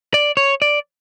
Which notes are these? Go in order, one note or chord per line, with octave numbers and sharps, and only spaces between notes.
D5
C#5
D5